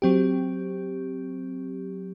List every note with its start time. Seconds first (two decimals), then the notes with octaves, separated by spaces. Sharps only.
0.02 F#3 C4 G4